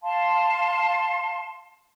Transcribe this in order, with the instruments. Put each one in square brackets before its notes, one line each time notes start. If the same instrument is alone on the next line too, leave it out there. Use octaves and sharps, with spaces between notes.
[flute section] F5 A5 C6